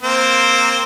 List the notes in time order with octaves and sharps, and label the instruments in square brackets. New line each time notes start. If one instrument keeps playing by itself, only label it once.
[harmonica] A#3 C4 C5